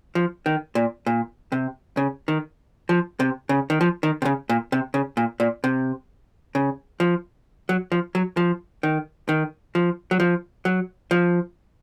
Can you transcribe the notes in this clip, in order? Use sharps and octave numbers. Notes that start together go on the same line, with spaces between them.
F3
D#3
A#2
A#2
C3
C#3
D#3
F3
C3
C#3
D#3
F3
D#3
C3
C#3
A#2
C3
C#3
A#2
A#2
C3
C#3
F3
F#3
F3
F#3
F3
D#3
D#3
F3
F#3
F3
F#3
F3